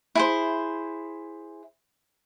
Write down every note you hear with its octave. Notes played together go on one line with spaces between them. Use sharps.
E4 G#4 C5